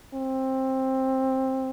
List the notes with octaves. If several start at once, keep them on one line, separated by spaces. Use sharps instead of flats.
C4